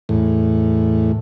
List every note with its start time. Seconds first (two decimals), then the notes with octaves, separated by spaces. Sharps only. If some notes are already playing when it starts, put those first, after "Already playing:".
0.09 E2 A2